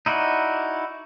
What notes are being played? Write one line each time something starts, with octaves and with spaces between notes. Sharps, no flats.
D#4 E4 F#4 D5